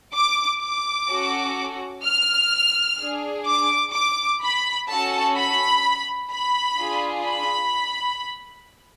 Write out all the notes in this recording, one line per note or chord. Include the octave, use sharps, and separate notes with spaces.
D6
D6
C#4 F#4 A4
F6
D4 G#4
D6
D6
B5
C#4 F#4 A4 A5
B5
B5
D4 F4 G#4
B5